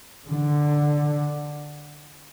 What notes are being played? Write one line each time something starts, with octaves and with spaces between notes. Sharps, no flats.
D3